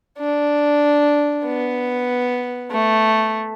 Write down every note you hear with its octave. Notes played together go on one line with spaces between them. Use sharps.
D4
B3
A3